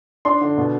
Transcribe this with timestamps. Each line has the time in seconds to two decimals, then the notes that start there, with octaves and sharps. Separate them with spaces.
0.25 D4 C6
0.41 D3
0.58 B2